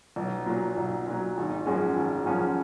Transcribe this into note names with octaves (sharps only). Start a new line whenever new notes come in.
B1
A#2 F#3
B1
A#2 F#3
G#1
F#2 F3 G#3 C#4
G#1
F#2 F3 G#3 C#4